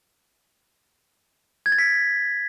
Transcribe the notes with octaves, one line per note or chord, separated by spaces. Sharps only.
G#6
A6
B6